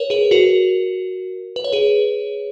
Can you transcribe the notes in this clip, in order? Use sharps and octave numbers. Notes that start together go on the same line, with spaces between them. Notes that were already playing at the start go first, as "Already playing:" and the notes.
Already playing: A#4 B4 C#5
G#4 B4
F#4 A#4
B4
C#5
G#4 B4